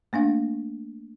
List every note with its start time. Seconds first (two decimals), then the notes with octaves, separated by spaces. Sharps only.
0.13 A3 A#3 D4 F5